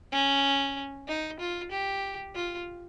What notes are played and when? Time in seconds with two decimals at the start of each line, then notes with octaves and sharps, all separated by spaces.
0.12 C#4
1.08 D#4
1.40 F4
1.71 G4
2.35 F4